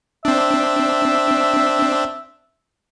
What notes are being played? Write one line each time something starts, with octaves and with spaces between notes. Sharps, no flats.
C4 D4 E5